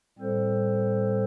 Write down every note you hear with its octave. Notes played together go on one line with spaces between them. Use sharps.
A2 G3 C4 A4 C5